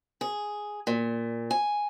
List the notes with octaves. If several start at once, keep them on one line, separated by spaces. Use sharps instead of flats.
G#4
A#2
G#5